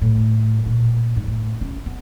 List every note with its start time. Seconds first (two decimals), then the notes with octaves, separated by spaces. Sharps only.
0.01 A2
0.66 A#2
1.16 G#2
1.28 A2
1.61 C#4
1.86 B3